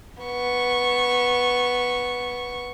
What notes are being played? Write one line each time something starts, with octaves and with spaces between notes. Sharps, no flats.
B3 C#6